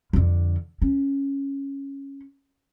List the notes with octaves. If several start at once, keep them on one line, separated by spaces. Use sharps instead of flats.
F2 D3
C#4